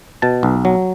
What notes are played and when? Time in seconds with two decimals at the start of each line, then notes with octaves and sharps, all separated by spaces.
0.22 B2 A5
0.43 B1
0.65 F#3